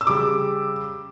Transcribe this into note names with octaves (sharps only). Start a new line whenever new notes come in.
E6
C#3 G3 D6